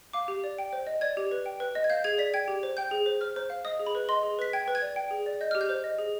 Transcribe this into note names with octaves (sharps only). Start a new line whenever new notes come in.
F5 D6
G4
D5
G5
C5
D#5
D5 G#6
G4
B4
G5
B4
D#5
G#6
F5 G6
G#4 G#6
D5 B6
G5 G#6
G4
C5
G5 G6
G#4
C5
C5 F6
C5
F5
D#5 D#6
G#4
B5
B4
D#5 C6
G#4
B4 B6
G5 G#6
B4
G#6
D5
G5
G#4
D5
D#5 G6
G4 F6
G6
C5
D#5
G#4